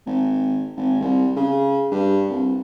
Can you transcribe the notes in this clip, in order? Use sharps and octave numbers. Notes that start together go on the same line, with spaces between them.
G#1
G#1
C2
C#3
G2
C2